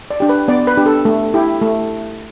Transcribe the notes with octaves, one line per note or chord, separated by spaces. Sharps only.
D5
D4 G4
B4
B3 D5
B4
D4 G4
A4
A3
E4 G4
A3